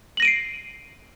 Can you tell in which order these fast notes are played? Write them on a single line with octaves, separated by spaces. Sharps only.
F#7 A#6 D#7 D7 C7